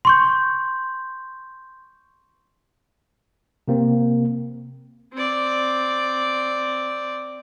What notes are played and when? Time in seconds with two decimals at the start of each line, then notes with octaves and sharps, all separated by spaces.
0.05 C6 C#6 G6
3.68 C3 A#3 C4
5.14 C4 D5